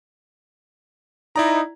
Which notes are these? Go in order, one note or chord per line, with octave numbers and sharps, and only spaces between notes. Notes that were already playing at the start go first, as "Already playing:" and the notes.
D#4 E4 D5 A#5